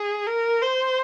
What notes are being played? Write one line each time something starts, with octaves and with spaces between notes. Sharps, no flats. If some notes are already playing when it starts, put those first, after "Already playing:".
Already playing: G#4
A#4
C5